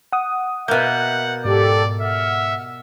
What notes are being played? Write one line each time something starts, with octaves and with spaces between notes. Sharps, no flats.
F#5 D#6
B2 A#3 E5 F#5 G6
G#2 G4 A4 D5
E5 F#5 F6